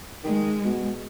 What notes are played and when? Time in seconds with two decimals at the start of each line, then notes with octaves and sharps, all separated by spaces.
0.24 D#3 G#3
0.65 B2